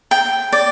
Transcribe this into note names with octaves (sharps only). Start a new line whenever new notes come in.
G5
D5